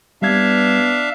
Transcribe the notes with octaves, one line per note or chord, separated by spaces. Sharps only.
G3 B3 D4 E5 F5 G#6